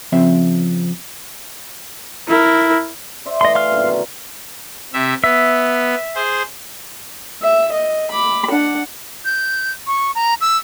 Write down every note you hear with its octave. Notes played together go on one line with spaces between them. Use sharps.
C#3 F3 C4 E5
E4 A#4
C5 D5 E5
E3 A3 D#5 C6
F5 C6 F6
F#2 A#2 D3
B2 D#3
C3 E5
B3 E5
G#4 C5
E5
D#5
B5 D6
D4 F#5
G6
C#6
A#5
E6